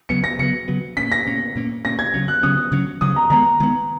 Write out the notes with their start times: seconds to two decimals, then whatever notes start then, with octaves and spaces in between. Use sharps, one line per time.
0.09 C#3 F#3 B3 C#7
0.24 A#6
0.39 C#3 F#3 B3 C#7
0.68 C#3 F#3 B3
0.97 A#2 A#3 C#4 B6
1.12 A#6
1.27 A#2 A#3 C#4
1.56 A#2 A#3 C#4
1.85 A#2 A#3 C#4 A#6
1.99 G#6
2.14 C#3 F#3 C#4
2.28 F#6
2.43 C#3 F#3 C#4 D#6
2.72 C#3 F#3 C#4
3.01 C#3 F#3 C#4 D#6
3.16 A#5
3.30 D#3 G#3 B3 A#5
3.60 D#3 G#3 B3